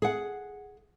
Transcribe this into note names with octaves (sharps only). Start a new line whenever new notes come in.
G#4 F#5